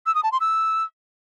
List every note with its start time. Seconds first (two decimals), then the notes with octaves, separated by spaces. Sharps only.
0.06 E6
0.15 D#6
0.23 A5
0.32 C6
0.41 E6